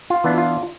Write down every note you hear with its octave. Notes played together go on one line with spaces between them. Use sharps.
F4
E3 B3 D4
F4